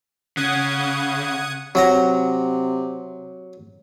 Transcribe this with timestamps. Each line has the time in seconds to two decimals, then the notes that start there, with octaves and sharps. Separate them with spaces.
0.37 C#3 F#5 D#6 G#6
1.75 C3 F#3 F#5 A#5